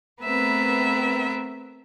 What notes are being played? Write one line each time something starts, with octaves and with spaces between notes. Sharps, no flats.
A3 B3 C4 A#4 B4 E5